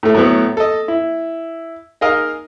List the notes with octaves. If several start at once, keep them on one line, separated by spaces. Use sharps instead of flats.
A2 A3
A2 F#3 B3
A4 D#5
E4
D#4 G#4 A#4 D#5 F5